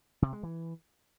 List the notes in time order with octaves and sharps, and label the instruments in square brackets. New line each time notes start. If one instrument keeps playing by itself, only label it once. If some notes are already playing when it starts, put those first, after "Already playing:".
[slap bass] C3
G#3
E3